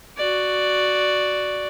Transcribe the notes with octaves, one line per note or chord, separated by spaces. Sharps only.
F#4 D5